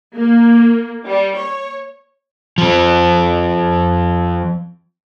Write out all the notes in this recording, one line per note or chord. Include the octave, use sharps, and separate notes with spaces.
A#3
G3
C#5
F3 C4